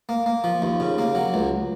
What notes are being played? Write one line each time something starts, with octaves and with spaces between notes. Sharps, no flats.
A#3
A#3
F3
D#2
C#3
A#3
F#3
C#2